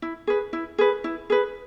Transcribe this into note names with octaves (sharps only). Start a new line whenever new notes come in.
E4
G#4 B4
E4
G#4 B4
E4
G#4 B4